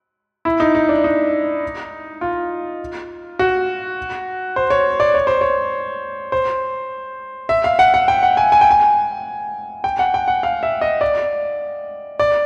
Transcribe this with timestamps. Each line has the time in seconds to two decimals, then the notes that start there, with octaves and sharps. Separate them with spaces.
0.45 E4
0.60 D#4
0.75 D#4
0.89 D4
1.04 D#4
2.21 F4
3.39 F#4
4.56 C5
4.70 C#5
5.00 D5
5.14 C#5
5.27 C5
5.41 C#5
6.32 C5
7.49 E5
7.64 F5
7.79 F#5
7.94 F#5
8.08 G5
8.23 F#5
8.37 G#5
8.52 G#5
8.61 G5
8.71 G#5
9.84 G5
9.99 F#5
10.14 G5
10.28 F#5
10.43 F5
10.63 E5
10.81 D#5
11.01 D5
12.19 D5